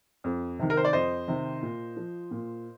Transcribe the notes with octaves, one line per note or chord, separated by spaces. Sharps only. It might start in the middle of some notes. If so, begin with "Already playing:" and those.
F2
C3 D#3
A#4
C5
D5
F2 C5 D#5
C3 D#3
A#2
F3
A#2